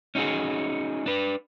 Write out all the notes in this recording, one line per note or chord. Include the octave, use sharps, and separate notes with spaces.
C#4 D#4 F#4 G#4
D4 B4